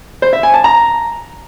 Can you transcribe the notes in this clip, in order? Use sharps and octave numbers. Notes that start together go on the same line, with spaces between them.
C5
E5
G#5
A5
A#5